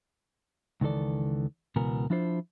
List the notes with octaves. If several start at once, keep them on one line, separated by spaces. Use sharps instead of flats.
C#2 D#3 E3 A4 D5
C#2 B2 E3 B3 A#4 G#5
F3 D4 E4 F4 C5